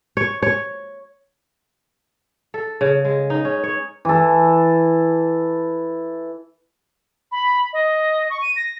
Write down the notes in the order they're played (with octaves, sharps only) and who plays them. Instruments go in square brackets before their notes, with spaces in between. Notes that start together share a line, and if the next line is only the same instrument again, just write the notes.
[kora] C#5
C#5
A4
C#3
G#3
D#4
C#4
C#5
[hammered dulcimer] E3 A4
[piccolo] B5
D#5
C#6
D#7
A#6